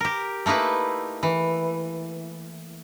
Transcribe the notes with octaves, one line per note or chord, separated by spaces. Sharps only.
G4 A#4
A3 A#3 D#4 E4 B4
E3